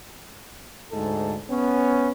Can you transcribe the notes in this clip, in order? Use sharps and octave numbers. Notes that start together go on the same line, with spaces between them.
D2 G#2 G#3 A4
B3 C#4